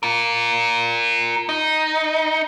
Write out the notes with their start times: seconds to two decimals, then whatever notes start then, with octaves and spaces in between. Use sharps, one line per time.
0.03 F4 A#4
1.49 D#4